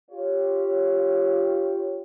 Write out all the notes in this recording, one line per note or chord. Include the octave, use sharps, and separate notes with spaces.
F4 G4 C#5